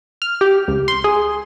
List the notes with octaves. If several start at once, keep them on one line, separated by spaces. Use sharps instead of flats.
F6
G4
C#2
C6
G#4